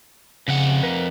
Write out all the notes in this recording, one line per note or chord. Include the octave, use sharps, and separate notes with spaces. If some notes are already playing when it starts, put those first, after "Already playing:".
F2 C#3 F#5
A#4 B4